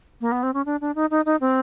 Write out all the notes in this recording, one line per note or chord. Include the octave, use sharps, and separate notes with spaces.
A#3
B3
C4
C#4
D4
D4
D#4
D#4
D#4
C4